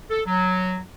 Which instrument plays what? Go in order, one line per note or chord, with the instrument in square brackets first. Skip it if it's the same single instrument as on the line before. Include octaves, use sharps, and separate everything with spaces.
[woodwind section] A4
F#3